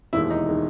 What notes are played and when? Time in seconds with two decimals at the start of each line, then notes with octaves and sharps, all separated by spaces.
0.13 E1 D#2 D#3 G#3 E4
0.30 D#4
0.49 D#3 G#3